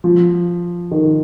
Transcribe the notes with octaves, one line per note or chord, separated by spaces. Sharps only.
F3
D#3